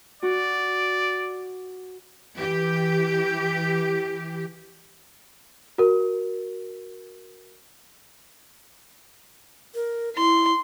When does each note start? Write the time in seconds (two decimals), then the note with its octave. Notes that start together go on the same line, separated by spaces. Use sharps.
0.23 F#4 D5
2.36 E3 G4
5.78 F#4 A#4
9.75 A#4
10.17 E4 C6